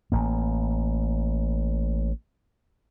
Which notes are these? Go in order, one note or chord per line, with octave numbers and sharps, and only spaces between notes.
A1 A#3